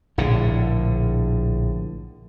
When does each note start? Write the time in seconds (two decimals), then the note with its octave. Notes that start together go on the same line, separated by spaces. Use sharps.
0.18 A#1 A2 D3